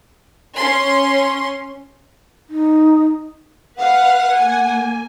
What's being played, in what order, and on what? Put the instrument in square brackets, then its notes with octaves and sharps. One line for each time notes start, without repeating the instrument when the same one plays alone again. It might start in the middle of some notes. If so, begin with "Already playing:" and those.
[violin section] C#4 C6
[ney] D#4
[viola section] B4 F5 [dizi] F#5
[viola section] A#3 G#5